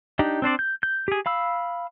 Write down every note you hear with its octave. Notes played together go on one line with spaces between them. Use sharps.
D4 D#4 G4
C4 D4 C5 D5
G6
G6
G4 G#4
F5 B5 E6